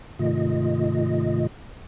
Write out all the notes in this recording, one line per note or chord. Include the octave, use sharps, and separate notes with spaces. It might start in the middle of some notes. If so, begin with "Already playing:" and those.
G#2 C3 D#3 A3 F4 D#5